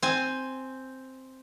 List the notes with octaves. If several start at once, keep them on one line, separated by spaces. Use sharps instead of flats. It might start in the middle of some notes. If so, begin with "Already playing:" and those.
C4 G#5